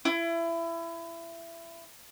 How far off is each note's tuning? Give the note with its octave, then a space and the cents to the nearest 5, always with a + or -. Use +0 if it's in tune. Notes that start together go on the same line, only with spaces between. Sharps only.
E4 +25